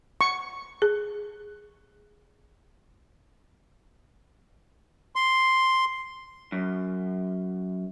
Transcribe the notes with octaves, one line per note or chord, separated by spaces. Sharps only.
C#6
G#4
C6
F#2